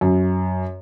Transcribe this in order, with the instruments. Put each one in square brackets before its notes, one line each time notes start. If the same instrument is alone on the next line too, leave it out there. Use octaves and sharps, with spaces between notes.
[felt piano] F#2